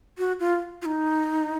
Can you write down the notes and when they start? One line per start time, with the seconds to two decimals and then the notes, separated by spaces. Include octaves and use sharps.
0.18 F#4
0.40 F4
0.82 F4
0.85 D#4